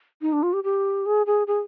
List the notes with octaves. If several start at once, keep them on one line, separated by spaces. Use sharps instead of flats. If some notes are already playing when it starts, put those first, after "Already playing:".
D#4
D4
F4
G4
G4
G#4
G#4
G#4